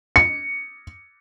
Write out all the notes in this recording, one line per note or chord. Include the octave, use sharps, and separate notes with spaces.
C#7